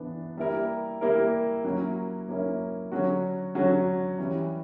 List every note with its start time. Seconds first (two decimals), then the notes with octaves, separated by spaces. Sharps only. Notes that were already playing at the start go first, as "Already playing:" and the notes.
Already playing: E3 B3 D4
0.37 G3 A#3 E4 A#4
1.01 G3 A#3 E4 A#4
1.64 F#3 A#3 C#4 E4
2.28 F#3 A#3 C#4 E4
2.92 D3 F#3 C#4 F#4
3.55 D3 F#3 C#4 F#4
4.18 E3 G3 C#4